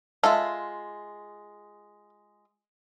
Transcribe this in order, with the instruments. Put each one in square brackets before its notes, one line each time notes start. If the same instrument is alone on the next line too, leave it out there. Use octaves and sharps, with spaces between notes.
[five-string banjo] G#3 F4 E5 [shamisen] A4